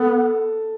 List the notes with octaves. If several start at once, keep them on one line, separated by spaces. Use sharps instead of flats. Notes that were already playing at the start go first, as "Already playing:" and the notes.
Already playing: B3 A4